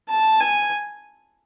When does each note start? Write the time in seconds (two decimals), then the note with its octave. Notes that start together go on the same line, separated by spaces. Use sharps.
0.10 A5
0.40 G#5